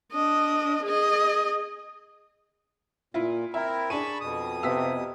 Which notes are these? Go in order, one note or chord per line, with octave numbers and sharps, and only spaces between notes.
D4 D#5
G#4 D#5
A#2 E4 F4
C4 E4 A#4 E5
D4 G#4 A5 B5 C#6 D#7
F2 B2 D#6
C3 B3 F5 E6 B6